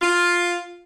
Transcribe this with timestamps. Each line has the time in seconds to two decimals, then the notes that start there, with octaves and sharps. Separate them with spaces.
0.02 F4